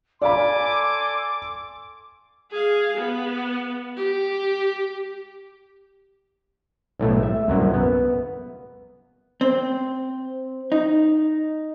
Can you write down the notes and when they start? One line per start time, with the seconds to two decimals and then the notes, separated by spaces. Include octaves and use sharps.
0.22 A4 D5 F5 G#5 B5 C6 D6
2.51 G#4 F5
2.97 B3
3.96 G4
6.99 B1 A2 A3
7.23 E5
7.48 C2 F#2 A#3
7.74 B3
9.41 C4
10.72 D#4